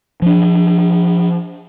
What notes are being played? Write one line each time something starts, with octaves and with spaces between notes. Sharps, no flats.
F3 D4